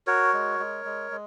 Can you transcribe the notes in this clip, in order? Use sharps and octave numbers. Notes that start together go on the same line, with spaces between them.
F#4 A#4 C#5
G#3
G#3
G#3
G#3